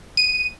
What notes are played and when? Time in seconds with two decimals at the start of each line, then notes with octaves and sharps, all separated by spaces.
0.17 D#7